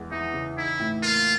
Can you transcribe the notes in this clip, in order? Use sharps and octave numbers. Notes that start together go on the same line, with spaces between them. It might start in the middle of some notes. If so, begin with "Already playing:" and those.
Already playing: E2 G#3
E3 D#4
C#3
D#4 E4
A2
A#3 F4